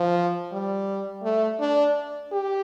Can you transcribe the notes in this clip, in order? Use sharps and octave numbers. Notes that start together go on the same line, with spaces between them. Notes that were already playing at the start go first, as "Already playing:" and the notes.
Already playing: F3
G3
A3
D4
G4